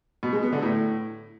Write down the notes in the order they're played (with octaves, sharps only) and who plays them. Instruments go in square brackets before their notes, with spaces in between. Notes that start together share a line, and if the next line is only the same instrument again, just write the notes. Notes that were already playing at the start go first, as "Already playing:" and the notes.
[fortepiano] B2
G#3
B3
D3
A2